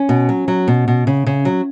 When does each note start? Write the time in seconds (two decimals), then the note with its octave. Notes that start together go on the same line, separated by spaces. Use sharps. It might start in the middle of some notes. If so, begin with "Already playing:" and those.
Already playing: C#4
0.09 B2
0.29 F#3
0.48 F#3
0.68 B2
0.88 B2
1.07 C#3
1.26 C#3
1.45 F#3